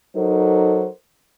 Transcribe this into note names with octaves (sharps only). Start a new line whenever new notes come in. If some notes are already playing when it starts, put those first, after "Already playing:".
F#3 D#4 A4 A#4 C5